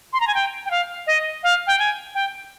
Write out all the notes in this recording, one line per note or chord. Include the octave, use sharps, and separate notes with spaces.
C6
A#5
G#5
G5
G5
F5
D#5
F5
G5
G#5
G5